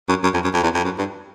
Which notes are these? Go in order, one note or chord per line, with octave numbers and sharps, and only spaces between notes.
F#2
F#2
F2
F#2
F2
E2
F2
F#2
G2